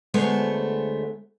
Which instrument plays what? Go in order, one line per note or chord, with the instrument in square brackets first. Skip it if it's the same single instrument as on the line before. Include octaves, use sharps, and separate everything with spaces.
[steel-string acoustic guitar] D2 G#3 A3 B3 C5 C#5